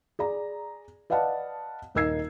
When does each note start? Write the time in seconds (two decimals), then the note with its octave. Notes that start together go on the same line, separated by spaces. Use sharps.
0.19 G#4 D5 A#5
1.10 B4 D5 D#5 F5 F#5 A5
1.95 D#1 D#4 A#4 E6 G#6 C7